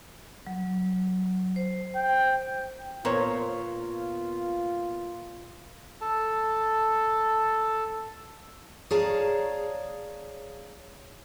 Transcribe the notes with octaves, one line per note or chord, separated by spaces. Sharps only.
F#3
C5
G5
A#2 B3 F4 A#4 C5 C#5
A4 A5
G#4 C#5 D5 F5 A5 A#5